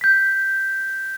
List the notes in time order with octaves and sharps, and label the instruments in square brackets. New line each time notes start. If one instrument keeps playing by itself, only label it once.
[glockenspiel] G6 B6